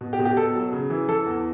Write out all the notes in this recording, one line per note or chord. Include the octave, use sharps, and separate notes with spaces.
B2
G4
B2
G4
B2 A4
F#3
C#3
E3
E3 A4
E2